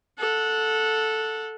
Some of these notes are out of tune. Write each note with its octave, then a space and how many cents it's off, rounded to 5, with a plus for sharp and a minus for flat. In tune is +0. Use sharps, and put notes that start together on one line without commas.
A4 +0 F#5 -20